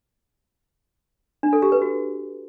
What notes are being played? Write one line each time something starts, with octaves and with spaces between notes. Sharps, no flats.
D4
A4
G4
B4
F#4